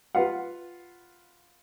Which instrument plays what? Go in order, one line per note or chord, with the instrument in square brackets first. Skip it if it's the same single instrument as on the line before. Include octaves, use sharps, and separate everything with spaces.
[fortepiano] F4 B4 F5 F#5